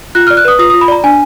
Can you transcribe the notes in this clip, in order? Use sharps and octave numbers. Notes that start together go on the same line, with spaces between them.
F4 F#6
D5 F6
F#6
B4 D#6
F4 D#6
F4 D#6
B5
D5 A#5
D4 G#5